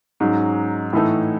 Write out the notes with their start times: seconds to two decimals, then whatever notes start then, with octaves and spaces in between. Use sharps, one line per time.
0.20 G#2 F#3 C#4 D#4
0.93 A2 E3 A3 D#4 E4 A4